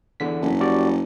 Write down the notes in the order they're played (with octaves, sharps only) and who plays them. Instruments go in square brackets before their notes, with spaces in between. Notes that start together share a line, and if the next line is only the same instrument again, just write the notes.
[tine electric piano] E2 D3 B6
[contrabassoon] F#1
[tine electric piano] G3 F#4 D5